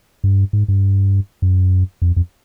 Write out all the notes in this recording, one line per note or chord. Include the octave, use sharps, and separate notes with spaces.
G2
G#2
G2
F#2
F2
F2